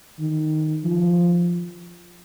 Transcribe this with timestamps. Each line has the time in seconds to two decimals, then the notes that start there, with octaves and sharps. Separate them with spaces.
0.20 D#3
0.84 F3